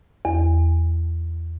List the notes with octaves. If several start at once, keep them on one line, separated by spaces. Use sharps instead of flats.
E2